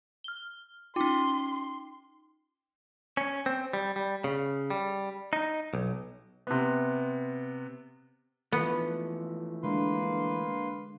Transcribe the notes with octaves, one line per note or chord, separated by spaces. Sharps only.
F6 G7
C#4 D#4 F4 G5 C6 D6
C#4
C4
G3
G3
C#3
G3
D#4
B1
C3 B3
E3 F3 A3 B3
D3 G#3 A#3 B4 C6